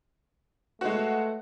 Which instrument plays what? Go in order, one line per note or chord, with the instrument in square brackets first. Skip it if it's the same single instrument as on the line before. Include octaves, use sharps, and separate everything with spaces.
[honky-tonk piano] G#3 F#4 [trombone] A3 [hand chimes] B4 C#5 E5 [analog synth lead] F#5